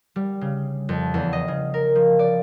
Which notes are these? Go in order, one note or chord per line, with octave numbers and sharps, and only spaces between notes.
G3
C#3
F2
E2
D#5
C#3
A#4
F3
D5